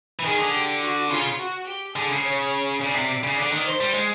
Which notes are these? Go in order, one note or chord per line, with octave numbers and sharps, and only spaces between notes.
E3
D#3 G#4
D3
G4
F#4
C#3 F4
F#4
G4
D3 G#4
C#3
C#5
C#3 D5
C3
C#3
D3 D5
D#3
C5
G3
G#3